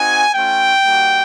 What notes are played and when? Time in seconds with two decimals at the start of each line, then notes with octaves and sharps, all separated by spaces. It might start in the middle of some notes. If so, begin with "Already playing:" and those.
Already playing: C4 D#4 F#4 G#5
0.35 A3 C#4 F4 G5
0.85 G3 A#3 D#4 F#4